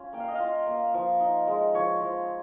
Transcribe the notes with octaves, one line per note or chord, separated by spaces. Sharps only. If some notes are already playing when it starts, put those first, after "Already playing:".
Already playing: C#4 F4
A#3 G5
F5
D#5
F4 F5
A#3
F3
D#4
G#3
F3 C#5
F3